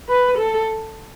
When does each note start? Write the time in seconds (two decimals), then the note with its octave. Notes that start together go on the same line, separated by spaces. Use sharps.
0.08 B4
0.38 A4